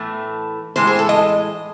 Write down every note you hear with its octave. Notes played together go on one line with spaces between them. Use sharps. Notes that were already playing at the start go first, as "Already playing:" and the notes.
Already playing: A2 E3 A3
A2 E3 G#3 C5
G#4
A4
D#5